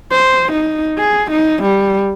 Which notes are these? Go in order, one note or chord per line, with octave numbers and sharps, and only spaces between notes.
C5
D#4
G#4
D#4
G3